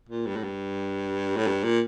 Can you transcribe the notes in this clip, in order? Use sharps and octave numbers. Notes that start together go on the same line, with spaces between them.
A#2
G2
A2
G2
A2
G2
A#2